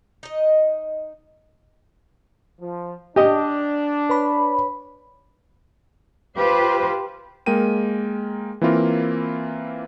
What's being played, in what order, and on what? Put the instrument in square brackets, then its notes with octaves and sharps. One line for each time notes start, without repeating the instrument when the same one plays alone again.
[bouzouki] D#4 D#5
[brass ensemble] F3
[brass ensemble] D4 [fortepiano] G4 D#5
[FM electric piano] B4 C#5 B5
[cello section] F4 G4 B4 C5
[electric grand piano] G#3 A#3 A#4 G5 D#7
E3 A#3 C4 E4 F4 A#4